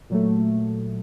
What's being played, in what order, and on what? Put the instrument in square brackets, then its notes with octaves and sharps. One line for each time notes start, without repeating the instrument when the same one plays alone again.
[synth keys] A#2 F#3 A3